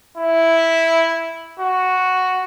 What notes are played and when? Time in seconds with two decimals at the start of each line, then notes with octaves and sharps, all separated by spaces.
0.18 E4
1.60 F#4